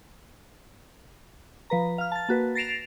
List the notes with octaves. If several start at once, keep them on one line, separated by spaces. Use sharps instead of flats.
F3 B4 A#5
F5 F6
A5 A6
A#3 F#4 B4
A6 A#6 C7 D7 E7 F7